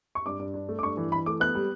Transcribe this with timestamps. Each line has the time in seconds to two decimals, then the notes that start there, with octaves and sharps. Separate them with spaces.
0.15 C#6
0.26 G2 D6
0.39 G2
0.54 D4
0.69 A3
0.79 D6
0.83 G2 C#6
0.97 E3
1.12 E3 B5
1.26 A3 D6
1.40 B3 F#6
1.55 G3